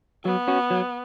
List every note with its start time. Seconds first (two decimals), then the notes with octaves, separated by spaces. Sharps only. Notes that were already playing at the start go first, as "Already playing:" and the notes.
0.25 F#3 B3
0.48 C#4 F#4
0.70 F#3